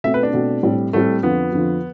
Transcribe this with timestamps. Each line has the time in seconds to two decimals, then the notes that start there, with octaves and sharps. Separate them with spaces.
0.04 B2 A3 C4 E5
0.14 B4
0.23 D4
0.33 B2 A3 C4
0.63 A2 G3 C4
0.93 A2 G3 A3 C4
1.23 F2 D3 F3 B3
1.52 F2 D3 F3